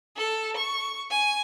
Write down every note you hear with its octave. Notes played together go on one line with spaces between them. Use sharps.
A4
C#6
G#5